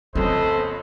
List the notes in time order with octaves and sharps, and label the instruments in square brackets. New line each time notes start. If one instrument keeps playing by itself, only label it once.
[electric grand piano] F2 C#3 A3 [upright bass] B3 [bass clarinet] A4 [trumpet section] B4 C5 D#5